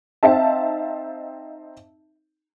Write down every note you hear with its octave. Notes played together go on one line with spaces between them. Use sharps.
C4 D#4 E5 F5 A5